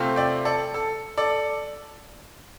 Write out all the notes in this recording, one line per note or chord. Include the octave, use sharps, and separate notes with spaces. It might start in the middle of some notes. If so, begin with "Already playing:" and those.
Already playing: C3 A3 C4 F4
D5 G5
A4 D5
A4
A4 D5